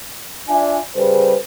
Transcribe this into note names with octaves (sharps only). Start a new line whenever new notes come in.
D4 F4 D5 E5 G#5
C#3 G3 G#4 A4 B4 C5